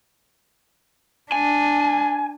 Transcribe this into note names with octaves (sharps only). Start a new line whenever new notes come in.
D4 G#5